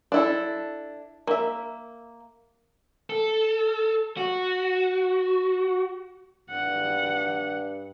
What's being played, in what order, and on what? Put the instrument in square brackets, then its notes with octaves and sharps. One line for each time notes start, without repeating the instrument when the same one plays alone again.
[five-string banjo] D4 E4 A4
A#3 E5
[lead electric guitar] A4
F#4
[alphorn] G2 [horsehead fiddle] F#5